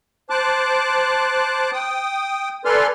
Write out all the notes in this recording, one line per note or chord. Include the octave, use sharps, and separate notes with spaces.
C5 A5 D6 F#6
G5 D#6
A4 B4 D5 G#5 C6 F6